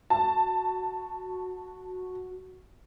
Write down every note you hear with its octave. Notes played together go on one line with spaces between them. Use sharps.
F#4 A5